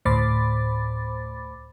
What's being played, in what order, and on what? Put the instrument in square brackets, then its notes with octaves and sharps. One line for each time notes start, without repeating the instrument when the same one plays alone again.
[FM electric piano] D2 A2 C5 B5 D6 A6